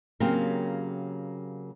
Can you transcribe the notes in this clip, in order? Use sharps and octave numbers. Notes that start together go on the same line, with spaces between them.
C#3 F#3 A#3 C4 G4 A#4